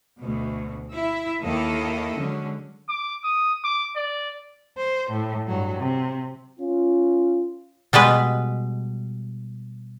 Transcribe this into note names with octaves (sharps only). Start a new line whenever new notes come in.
D2 B2
E4 E5
D#2 D#3 A#3 E4 A4 D#5
D3 F#3 G#3 C#4
D6
D#6
D6
D5
C5
A2
G2 F#3
C3
C#4 F4
B2 G3 G#3 B4